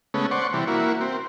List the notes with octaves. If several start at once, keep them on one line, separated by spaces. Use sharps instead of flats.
C#3 G#3 A3 B3 C#4
C5 D5 F#5 C#6
C3 E3 G3
A#3 E4 F#4
C4